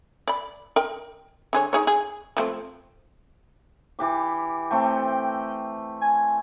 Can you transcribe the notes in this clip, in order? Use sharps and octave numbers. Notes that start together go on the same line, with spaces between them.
D5 B5
A#4 D#5 G5
D3 G#4 C#5
D#4 G#4 C#5
G#4
F3 A3 C4
E3 G4 D6
A3 C4 G5
G#5